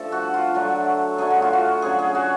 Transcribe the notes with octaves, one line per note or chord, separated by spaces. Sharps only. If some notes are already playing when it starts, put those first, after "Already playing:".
Already playing: F3 A3 D4 A4
F#4
F4
D3 F#3 A3 D4 F#4
D3 F#3 A3 D4 G#4
F#4
F4
F#4
D3 F#3 C#4 F4 G#4
G#4
F#4